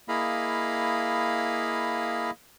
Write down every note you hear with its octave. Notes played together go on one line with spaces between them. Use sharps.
A#3 E4 G#4 D#5 F5 B5